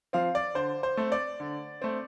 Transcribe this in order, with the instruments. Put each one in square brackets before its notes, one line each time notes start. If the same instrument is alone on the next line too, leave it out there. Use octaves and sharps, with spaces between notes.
[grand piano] F3 C4 F5
D5
D3 C5
C5
A3 C4
D5
D3
A3 C4